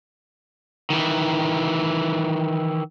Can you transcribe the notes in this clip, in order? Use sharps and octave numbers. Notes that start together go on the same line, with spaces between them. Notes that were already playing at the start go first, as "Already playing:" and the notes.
D#3 E3